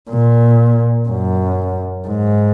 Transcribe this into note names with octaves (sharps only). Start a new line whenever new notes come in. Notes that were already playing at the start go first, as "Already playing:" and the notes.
A#2
F#2
G#2